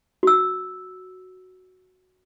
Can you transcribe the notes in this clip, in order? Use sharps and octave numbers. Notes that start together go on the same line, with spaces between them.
F#4 E6